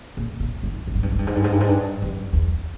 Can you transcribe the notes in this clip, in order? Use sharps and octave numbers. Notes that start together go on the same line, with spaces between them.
A#2
A#2
G#2
G2
G#2
G2
G#2
G2
G#2
G2
G#2
G2
G#2
G2
F#2
E2